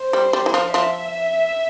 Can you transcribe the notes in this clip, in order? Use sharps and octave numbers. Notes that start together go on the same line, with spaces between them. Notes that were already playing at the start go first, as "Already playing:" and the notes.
Already playing: C5
G3
G3
E3
F3
F3 E5